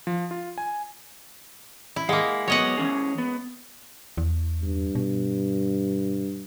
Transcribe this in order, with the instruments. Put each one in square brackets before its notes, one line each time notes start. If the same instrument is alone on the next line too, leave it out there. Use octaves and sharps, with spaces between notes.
[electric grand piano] F3
F4
G#5
[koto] E4
[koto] G#3 A#3 [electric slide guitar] F5 F#5
[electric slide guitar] F#3 B3 [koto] C#5 D#5 F#5
[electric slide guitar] E3 C#4 G#4
B3
[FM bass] E2
[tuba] G2
[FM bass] B2